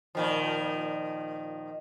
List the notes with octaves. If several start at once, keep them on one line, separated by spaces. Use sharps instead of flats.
A#2 D#3 F3